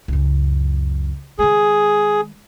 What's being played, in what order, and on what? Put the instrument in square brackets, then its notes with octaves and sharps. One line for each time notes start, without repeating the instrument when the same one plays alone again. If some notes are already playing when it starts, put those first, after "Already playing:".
[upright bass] C#2 F#2
[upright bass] D#3 G#3 [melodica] G#4